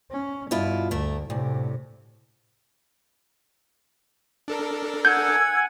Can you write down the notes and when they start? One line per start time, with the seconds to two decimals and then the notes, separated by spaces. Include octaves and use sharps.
0.12 C#4
0.51 G2 B2 E4 F4
0.91 D2 A3 A#4
1.30 D2 A2 C3
4.48 D4 A4 A#4
5.05 F#5 G#5 E6 G6 G#6